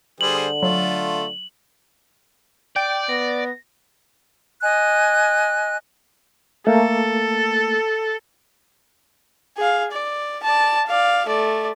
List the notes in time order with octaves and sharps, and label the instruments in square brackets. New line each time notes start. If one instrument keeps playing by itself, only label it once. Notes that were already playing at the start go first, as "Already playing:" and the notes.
[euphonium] D3 [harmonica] G3 G#4 C5 [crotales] F#7
[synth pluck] F#3 [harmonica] A3 F4
[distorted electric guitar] D5 [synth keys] G5 G6 D7
[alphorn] B3 [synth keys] A#6
[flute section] D#5 G#5 F#6
[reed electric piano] A3 A#3 [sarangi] A4
[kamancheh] G#4 F5
D5
D5 A5
D5 F5
A3 D5